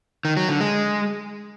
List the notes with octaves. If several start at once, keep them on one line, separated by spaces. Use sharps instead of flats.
D#3
F#3
D3
G#3